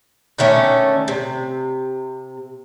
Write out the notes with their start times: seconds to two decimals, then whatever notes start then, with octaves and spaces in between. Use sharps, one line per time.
0.38 D3 D#3 A3 C#4
1.08 C3